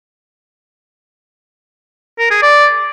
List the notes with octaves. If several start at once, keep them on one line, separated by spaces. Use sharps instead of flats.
A#4
G#4
D5